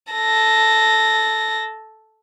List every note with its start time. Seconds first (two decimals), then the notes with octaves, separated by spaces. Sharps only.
0.13 A4 A#6